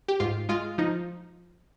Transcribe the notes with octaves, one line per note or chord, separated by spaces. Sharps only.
G4
G#2 F4
G#3 F4
F3 D#4